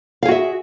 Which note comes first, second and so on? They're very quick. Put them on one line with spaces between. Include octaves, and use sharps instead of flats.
F5 G#4 F#4 E5